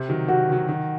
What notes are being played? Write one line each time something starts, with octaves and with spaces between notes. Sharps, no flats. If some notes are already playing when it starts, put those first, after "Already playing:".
Already playing: C3
D#3 F#3
C3 F#4
D#3 F#3
D#3